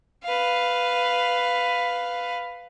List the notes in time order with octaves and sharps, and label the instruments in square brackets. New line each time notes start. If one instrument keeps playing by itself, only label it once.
[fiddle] B4 F5